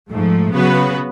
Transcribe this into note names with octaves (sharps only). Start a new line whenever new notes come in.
G#2 F3 A3
C#3 F#3 B3 F#4 B4